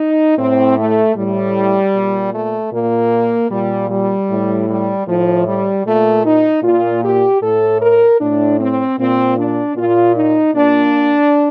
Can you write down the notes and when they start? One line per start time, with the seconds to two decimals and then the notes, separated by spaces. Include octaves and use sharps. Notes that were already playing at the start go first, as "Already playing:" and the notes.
Already playing: D#4
0.38 A2 C4
0.77 A3
1.15 A2 G3
1.95 A#2
2.33 A3
2.72 A#2 A#3
3.50 A#2 G3
3.90 G3
4.29 A2
4.69 G3
5.07 A2 F3
5.46 G3
5.85 A#2 A3
6.25 D#4
6.63 A#2 F4
7.03 G4
7.42 A2 A4
7.80 A#4
8.20 A2 D4
8.60 C4
8.98 A#2 C4
9.37 D4
9.76 A#2 F4
10.16 D#4
10.55 A#2 D4